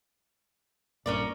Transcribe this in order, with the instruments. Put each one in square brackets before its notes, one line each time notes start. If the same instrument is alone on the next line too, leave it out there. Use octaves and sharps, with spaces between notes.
[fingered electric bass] A#1 G2 A#2 [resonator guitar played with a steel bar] C#4 A#4 D5